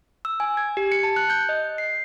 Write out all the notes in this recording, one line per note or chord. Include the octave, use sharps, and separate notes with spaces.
E6
G#5
G#6
G4
C#7
A5
F#6
G6
D#5
C7